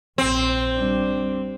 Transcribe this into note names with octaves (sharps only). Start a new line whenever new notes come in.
A#1 C4
G3 D4